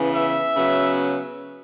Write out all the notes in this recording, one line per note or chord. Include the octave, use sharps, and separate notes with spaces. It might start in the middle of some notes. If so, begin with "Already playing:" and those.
Already playing: C#3 E3 B3
E5
C#3 F#3 B3